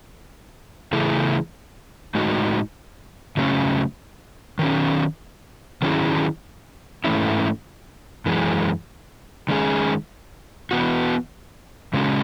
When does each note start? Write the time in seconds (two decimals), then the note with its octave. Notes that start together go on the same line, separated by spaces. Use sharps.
0.93 C#3 E3 A3 E4 G#4
2.15 A2 G#3 D#4 F#4
3.37 C#3 F#3 A3 C#4
4.59 D#3 F#3 C#4
5.82 D#3 F#3 C#4 E4 G#4
7.04 G#2 E3 A3 C#4 E4
8.26 F#2 E3 G#3
9.48 D#3 G#3 C#4 G#4
10.71 E3 B3 F#4
11.93 C#3 G#3 C#4 F#4